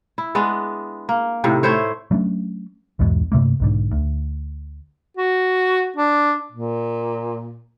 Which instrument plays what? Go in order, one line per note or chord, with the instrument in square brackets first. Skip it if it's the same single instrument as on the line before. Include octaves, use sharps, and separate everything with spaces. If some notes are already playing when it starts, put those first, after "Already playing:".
[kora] E4
G#3 B3 D4
A#3
A2 C3 D#3
A3 E4 C5 C#5
[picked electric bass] F#3 A3 C#4 D4
B1 E2 G#2 B2
G2 C3 A3 A#3
B1 G#2 D3
D2
[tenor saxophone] F#4
D4
A#2